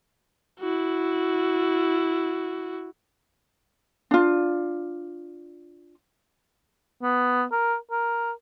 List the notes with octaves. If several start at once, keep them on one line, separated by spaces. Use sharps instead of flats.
E4 F#4
D4 F4
B3
A#4
A#4